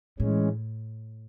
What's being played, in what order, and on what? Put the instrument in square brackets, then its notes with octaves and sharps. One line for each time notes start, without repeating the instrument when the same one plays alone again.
[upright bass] A2 [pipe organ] E3 G#3 C#4